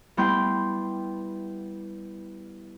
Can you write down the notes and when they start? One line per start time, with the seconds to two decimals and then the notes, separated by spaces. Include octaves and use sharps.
0.17 G3 B3 E4 G5 C6 G6